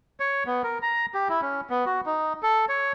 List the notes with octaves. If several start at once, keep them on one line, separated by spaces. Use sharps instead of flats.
C#5
B3
A#4
A#5
G4
E4
C#4
B3
F#4
D#4
A4
C#5